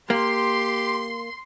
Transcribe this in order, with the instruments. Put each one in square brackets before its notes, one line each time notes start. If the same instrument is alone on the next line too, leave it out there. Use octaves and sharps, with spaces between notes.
[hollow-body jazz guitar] A#3 [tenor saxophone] G4 [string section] C6